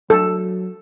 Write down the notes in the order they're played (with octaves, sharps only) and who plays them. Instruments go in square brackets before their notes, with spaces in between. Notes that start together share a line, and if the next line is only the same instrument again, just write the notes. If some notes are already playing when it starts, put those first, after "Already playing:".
[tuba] F#3 [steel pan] A4